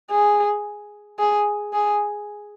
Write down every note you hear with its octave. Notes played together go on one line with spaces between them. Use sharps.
G#4
G#4
G#4